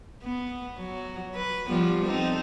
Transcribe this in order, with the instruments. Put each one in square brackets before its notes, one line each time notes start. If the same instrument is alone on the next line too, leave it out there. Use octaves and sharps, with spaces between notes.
[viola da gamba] B3
F#3
B4
F3 G3 B3
C4 D#4 A4